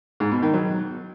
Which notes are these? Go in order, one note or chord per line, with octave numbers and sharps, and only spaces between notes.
G#2
B2
D#3
F#3